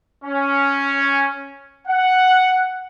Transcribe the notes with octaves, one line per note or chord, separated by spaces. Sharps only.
C#4
F#5